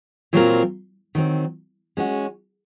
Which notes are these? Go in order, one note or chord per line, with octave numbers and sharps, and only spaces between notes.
A#2 F#3 C4 F4 A#4
D#3 F#3 C4
G#3 C#4 F#4